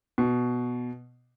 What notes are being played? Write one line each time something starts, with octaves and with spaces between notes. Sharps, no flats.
B2